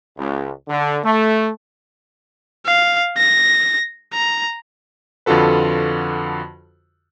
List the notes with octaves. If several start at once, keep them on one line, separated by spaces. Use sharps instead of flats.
C#2
D3
A3
F5
A#6
A#5
F2 D3 F4 F#4 A4 B4